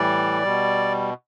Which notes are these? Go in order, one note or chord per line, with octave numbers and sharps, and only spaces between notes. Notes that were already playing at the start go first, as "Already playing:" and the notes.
Already playing: A2 E3 G3 D5
B2 G3